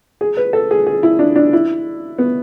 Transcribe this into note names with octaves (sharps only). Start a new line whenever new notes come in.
G#4
B4
A4
G#4
G#4
E4
D4
D4
E4
B3